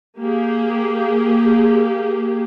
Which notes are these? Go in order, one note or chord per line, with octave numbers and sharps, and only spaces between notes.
A#3 G4 G#4